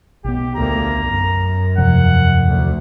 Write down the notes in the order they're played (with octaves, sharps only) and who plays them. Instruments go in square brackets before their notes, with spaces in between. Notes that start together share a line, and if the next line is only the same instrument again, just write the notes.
[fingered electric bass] B1 B3 [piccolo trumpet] G4
[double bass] D2 A#3 [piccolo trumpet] A#5
[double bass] F#2
[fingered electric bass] E2 C3 F3 [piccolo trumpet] F#5
[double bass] D2